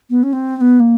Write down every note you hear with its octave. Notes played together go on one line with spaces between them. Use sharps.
B3
C#4
C4
C4
B3
A#3